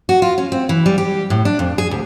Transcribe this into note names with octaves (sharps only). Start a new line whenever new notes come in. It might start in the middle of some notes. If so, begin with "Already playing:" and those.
F#4
F4
C#4
C4
E3
G3
G4
A2
D4
F2
G#4
D2